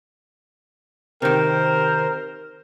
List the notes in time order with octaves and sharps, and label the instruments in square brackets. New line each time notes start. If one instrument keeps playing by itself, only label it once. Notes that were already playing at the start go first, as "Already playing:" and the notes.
[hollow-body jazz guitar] C3 D#3 [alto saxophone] A#4 [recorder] C5